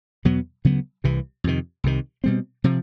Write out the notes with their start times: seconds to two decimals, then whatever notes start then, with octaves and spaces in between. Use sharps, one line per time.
0.25 E2 B2 F#3 B3
0.65 D2 C#3 F#3 B3
1.04 C2 C3 E3
1.44 F2 C3 D#3
1.84 C2 C3 D#3
2.24 B2 G3 C4
2.64 C3 F3